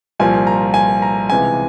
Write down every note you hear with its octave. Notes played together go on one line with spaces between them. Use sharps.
C2 A#2 F3 G#5
A#5
G#5
A#5
C#2 C3 E3 G#5